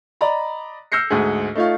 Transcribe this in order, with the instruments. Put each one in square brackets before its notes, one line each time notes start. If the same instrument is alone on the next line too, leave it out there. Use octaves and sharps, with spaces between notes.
[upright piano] D5 D#5 A#5 B5
E6 F6 G6 A#6 C7 C#7
D2 G#2 G#4
A3 D#4 F4 C#5 F5